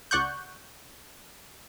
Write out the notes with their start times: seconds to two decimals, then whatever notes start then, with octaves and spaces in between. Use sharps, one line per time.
0.11 C#2 D5 F#5 C#6 F#6 G6